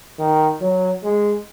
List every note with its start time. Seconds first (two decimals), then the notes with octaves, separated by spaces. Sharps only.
0.19 D#3
0.61 F#3
1.03 G#3